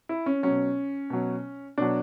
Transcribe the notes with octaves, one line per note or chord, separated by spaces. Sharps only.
E4
C#4
B2 F#3 C#4
B2 F#3
B2 F#3 D4